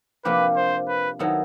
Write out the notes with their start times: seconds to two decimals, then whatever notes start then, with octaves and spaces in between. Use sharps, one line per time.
0.25 C3 F3 A#3 D4 G4 B4
0.56 C5
0.88 B4
1.19 D#3 F#3 B3 E4 A4